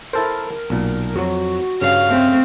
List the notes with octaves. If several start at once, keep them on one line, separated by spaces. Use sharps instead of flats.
E4 A4 A#4 C5
B1 A#2
F2 F#3 F#4
G2 C#3 F5
A3 C4